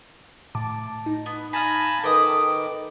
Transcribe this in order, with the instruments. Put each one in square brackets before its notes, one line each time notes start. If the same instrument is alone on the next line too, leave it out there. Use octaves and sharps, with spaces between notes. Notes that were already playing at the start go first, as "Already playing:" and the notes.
[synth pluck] A2 A5 D6
D#4
[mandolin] B3
[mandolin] D#4 F5 [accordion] G#5 A5 B5 [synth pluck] A#6
[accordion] D#3 D6 [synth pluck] A4 B4 D#5 [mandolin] G5 D#6